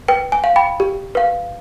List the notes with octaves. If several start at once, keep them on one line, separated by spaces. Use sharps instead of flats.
B4 G5
G#5
F5
G5 B5
G4
B4 F5